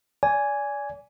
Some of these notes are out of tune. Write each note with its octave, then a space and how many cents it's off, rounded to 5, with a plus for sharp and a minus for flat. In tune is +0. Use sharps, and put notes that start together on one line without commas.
D5 -30 G#5 +0